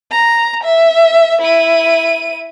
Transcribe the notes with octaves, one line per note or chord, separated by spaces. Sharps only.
A#5
E5
E4 D#7